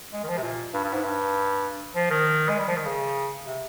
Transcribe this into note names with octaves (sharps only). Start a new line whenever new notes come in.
G#3
D#3
F3
C3
A#2
G2
G2
G#2
G2
F3
D#3
G#3
G3
F3
D#3
C#3
C3